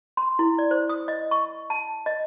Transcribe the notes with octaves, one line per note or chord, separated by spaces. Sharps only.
C6
E4
D5
C5
D#6
D#5
C#6
A5
D#5